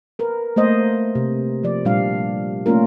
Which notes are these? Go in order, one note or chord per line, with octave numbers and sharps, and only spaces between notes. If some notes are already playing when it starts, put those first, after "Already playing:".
A#4 B4
A3 A#3 C5 D#5
C3
F3 D5
A#2 G3 D4 F5
A3 A#3 C#4 F4 A#4